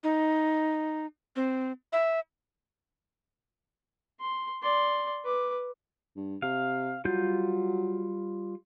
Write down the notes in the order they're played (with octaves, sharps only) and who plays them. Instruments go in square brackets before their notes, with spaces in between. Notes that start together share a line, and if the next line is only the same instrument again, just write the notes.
[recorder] D#4
C4
E5
[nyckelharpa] C6
D5 C6
B4 D6
[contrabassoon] G2
[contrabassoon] C3 [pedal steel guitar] F5
[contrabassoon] F#3 [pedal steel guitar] G3 F4 G6